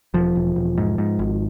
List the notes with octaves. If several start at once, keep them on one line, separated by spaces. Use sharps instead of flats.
E1 F3
E1
E1
G#2
G#2
G#1